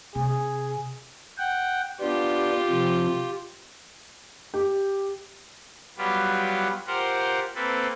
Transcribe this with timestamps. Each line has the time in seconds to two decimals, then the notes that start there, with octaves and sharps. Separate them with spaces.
0.15 C3 G#4
1.38 F#5 G5
2.01 B3 D4 F4 G4
2.68 C3 F3
4.54 G4
5.98 F#3 G3 B3 F4 G4 B4
6.87 F4 G4 A#4 C5 F#5
7.55 A#3 C4 A4 B4